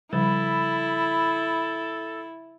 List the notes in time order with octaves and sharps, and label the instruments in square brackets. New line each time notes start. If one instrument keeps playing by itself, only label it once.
[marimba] C#3 F3 G3 [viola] E4 [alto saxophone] A4 [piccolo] B5